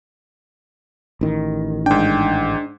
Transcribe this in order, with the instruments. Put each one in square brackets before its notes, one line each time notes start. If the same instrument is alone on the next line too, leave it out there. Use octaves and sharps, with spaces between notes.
[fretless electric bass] A1 D#3
[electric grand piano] G#2 G5 [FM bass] D4